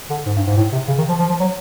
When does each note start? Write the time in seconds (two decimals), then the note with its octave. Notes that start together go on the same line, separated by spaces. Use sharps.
0.10 D3
0.26 G#2
0.36 G2
0.47 G#2
0.57 A2
0.72 C3
0.88 C#3
0.98 D#3
1.09 F3
1.19 F3
1.30 F3
1.40 F#3